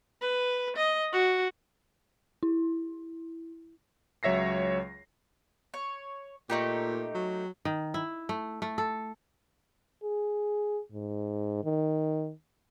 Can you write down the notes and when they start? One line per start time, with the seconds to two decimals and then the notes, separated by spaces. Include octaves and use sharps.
0.22 B4
0.77 D#5
1.13 F#4
2.43 E4
4.23 C#2 F#3 C#5 E5 A#6 C7
5.74 C#5
6.50 A#2 A3 D#4 G4
7.15 F#3
7.65 D#3
7.94 E4
8.29 A3
8.62 A3
8.78 A4
10.03 G#4
10.92 G#2
11.64 D#3